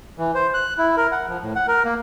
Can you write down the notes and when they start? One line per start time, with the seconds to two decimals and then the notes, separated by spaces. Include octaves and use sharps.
0.18 E3
0.35 C5
0.54 F#6
0.78 E4
0.97 A#4
1.12 F#5
1.28 F3
1.42 A2
1.55 F#5
1.68 A#4
1.85 A#3